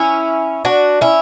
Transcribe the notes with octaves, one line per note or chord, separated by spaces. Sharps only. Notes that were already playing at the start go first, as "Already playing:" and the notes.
Already playing: C#4 E4
D4 F#4
C#4 E4